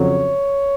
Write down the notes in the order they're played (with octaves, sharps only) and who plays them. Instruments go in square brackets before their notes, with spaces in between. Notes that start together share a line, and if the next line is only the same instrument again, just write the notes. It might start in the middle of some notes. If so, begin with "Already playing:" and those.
Already playing: [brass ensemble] F2 C#3 F#3 C#5